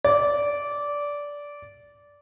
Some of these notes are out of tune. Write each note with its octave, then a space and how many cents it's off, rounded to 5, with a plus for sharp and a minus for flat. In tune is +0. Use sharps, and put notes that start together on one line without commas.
D5 -15